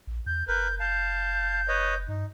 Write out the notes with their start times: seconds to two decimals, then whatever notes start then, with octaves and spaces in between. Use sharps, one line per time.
0.07 A#1
0.26 E2 G6
0.48 F#1 A#4 B4 G6
0.80 F5 A5 G6
1.68 B4 C#5 D#5
2.08 G2 D#4